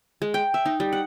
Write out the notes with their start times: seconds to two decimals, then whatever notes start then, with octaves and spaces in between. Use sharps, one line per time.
0.22 G#3
0.34 G5
0.54 E5
0.66 D#4
0.80 G3
0.93 F#5